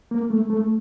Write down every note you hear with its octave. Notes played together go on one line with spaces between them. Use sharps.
A#3
A3
A3